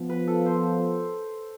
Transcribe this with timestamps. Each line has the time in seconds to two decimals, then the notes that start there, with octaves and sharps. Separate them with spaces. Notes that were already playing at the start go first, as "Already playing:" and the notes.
Already playing: F3 B3 F4
0.09 B4
0.27 A4
0.46 C5